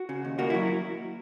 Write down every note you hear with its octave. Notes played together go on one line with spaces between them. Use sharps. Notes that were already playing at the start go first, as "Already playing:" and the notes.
Already playing: F#4
C#3
D#2
A#3 F#4
F#3 E4